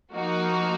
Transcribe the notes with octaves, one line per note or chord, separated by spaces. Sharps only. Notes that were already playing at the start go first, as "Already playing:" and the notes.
F3 A#3 D#4 F#4